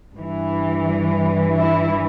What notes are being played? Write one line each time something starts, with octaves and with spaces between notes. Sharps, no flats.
G2 E3
E4